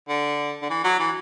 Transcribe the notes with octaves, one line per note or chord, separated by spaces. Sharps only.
D3
D3
E3
F#3
E3